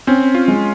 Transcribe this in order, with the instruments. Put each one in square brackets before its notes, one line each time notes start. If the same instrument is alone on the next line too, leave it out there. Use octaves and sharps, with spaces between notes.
[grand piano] C4 [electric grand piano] C#4
[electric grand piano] F4
[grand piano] G#3